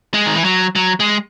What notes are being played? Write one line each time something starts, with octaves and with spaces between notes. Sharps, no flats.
G#3
D#3
E3
F#3
F#3
G#3